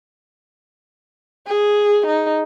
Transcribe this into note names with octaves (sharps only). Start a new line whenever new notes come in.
G#4
D#4